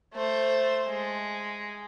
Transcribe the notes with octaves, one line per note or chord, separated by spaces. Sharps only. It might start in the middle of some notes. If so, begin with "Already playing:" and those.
A3 C5
G#3